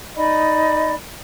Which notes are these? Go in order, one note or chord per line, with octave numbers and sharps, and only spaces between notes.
D#4 D5 D#5 B5